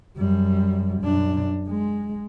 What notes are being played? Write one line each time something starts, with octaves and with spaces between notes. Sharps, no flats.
F#2 G3
F#2 D4
G#3